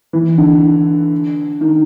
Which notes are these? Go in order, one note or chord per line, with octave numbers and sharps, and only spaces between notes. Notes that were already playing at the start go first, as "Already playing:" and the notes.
E3
D3
D#3